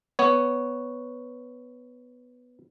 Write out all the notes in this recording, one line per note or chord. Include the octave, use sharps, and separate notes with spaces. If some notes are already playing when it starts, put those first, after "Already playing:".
B3 C#5